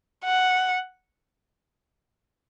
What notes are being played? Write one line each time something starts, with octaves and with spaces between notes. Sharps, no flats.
F#5